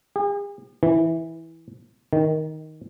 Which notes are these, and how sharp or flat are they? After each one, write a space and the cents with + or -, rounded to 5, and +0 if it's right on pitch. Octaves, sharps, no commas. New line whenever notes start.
G#4 -45
E3 -10
D#3 +5